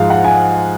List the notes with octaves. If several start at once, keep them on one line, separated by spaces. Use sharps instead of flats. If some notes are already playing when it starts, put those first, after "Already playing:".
Already playing: G#2 F3 G#3 F5
F#5
G#5